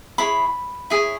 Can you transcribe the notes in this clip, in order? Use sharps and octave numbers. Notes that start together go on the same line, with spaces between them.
E4 G#4 C#5 B5
E4 G#4 C#5